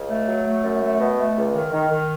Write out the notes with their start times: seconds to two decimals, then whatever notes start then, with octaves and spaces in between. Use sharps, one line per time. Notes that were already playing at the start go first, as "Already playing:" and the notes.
Already playing: C#2
0.09 A3
0.27 F#3
0.46 A3
0.63 F#2
0.82 A3
0.99 B2
1.18 A3
1.36 C#2
1.54 D#3
1.72 D#3
1.90 D#3